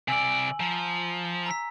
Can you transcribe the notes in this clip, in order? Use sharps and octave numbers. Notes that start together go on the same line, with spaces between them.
C3 D5 G#5 E6 F#7
F3 A#5
A#5 E6 B6